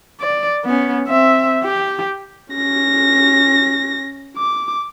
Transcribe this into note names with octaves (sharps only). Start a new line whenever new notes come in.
D5
B3 C#4
C4 E5
G4
C#4 A#6
D6